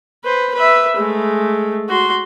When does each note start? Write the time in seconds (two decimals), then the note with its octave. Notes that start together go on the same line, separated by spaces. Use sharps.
0.24 B4 C5
0.55 B4 E5
0.97 G#3 A3
1.89 F#4 C6